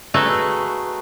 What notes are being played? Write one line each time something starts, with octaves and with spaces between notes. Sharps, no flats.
A3 D#4 F#4 G#4 A4 B4